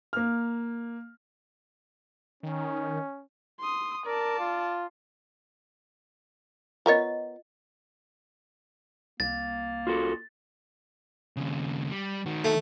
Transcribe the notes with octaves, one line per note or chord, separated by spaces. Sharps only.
A#3 F6
D#3 C#4
C6 D#6
A#4 D5 A5
F4
B3 F4 A#4 C#5 D#5
C2 A#3 A6
F4 F#4 A4
D#2 C#3
G3
D#3 F#4
A3